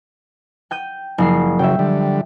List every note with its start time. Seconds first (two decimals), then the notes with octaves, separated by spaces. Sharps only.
0.71 G5 G6 D#7
1.18 F#1 F3 C7
1.59 C#3 F#3 E5 G5
1.79 D3 G3